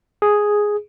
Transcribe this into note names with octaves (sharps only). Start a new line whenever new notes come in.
G#4